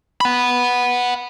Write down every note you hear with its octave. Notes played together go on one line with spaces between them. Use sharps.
F#5 B5